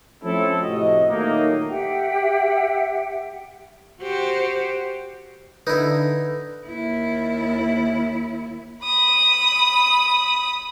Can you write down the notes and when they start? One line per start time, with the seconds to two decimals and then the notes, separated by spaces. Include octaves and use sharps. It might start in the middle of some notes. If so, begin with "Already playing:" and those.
0.24 F3 A3 C4 C#4 E4 A4
0.63 A2 C3 F#4 D#5
1.10 A#2 D#3 F#3 A3 A#3 D#4
1.69 G4 E5 F#5 G5
4.02 F#4 G4 C5
5.67 D3 D#4 E4 B4
6.66 D#2 E4
8.84 B5 D#6